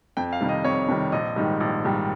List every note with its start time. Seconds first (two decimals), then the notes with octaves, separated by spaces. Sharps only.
0.17 F2 G5
0.33 F5
0.41 C3 D#3 G3
0.49 D#5
0.64 F2 C#5
0.88 C3 D#3 G3
1.12 A#1 D#5
1.36 G#2 D#3 G3
1.60 A#1
1.84 G#2 D#3 G3